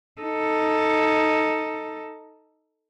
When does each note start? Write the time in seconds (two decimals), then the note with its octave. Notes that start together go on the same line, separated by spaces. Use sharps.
0.21 D#4 A4